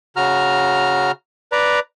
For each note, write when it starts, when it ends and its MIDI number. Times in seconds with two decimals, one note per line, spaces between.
0.16 1.11 49
0.16 1.11 66
0.16 1.11 82
0.16 1.11 89
1.52 1.80 71
1.52 1.80 74
1.52 1.80 82